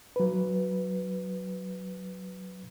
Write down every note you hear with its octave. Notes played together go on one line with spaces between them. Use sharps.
F#3 B4